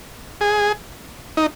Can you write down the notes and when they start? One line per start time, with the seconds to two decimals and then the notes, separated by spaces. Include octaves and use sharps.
0.41 G#4
1.37 D#4